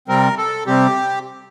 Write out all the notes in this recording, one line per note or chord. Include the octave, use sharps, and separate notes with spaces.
C3 G3 C4 A#4
A4
C3 G3 C4 G4